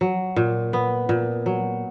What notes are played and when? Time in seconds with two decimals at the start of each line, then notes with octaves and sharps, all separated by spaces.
0.01 F#3
0.36 A#2
0.73 B3
1.09 A#2
1.46 F#3